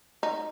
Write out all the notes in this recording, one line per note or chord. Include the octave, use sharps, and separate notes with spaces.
D#4